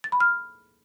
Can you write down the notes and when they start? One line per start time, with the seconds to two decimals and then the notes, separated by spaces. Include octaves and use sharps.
0.04 A6
0.12 B5
0.20 F6